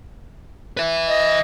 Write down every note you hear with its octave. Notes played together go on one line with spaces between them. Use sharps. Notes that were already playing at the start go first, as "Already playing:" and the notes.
B4 E5
D#5